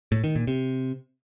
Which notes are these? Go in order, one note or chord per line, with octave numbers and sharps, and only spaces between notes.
A2
D#3
A#2
C3